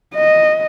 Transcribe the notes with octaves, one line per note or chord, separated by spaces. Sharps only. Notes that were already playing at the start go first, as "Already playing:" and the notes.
D#5